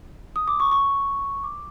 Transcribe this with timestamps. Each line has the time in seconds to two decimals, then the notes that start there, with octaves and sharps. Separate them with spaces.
0.36 D#6
0.48 D6
0.60 C#6
0.72 C#6
1.44 D6